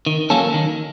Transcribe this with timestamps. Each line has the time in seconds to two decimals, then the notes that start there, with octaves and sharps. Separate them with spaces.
0.06 D#3
0.30 F#3 A#3 C#4 A4
0.54 D#3